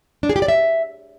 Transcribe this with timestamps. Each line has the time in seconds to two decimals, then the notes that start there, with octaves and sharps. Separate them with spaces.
0.23 D4
0.29 G#4
0.36 G4
0.42 D5
0.48 E5